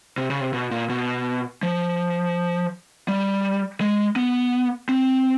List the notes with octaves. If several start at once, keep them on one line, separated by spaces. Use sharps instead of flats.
C3
C#3
C3
B2
A#2
B2
F3
G3
G#3
B3
C4